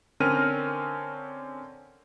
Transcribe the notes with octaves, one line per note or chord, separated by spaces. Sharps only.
D3 C4 C#4 A#4 F6 D#7